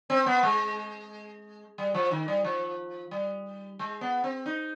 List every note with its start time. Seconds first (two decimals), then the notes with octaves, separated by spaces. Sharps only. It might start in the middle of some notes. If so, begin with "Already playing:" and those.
0.10 C4
0.26 B3
0.43 G#3
1.78 G3
1.94 F3
2.11 D#3
2.28 G3
2.44 F3
3.11 G3
3.79 G#3
4.01 B3
4.24 C4
4.46 D#4